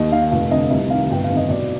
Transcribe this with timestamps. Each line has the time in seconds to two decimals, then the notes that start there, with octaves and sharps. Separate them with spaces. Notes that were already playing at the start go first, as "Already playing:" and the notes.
Already playing: D#2 D#5
0.12 D#3 F5
0.31 F1 F5
0.51 F2 D3 D#5
0.70 C2 D#5
0.90 C3 D#3 F5
1.11 G1 G5
1.24 F5
1.30 F2 D#3
1.37 D#5
1.49 B1 D5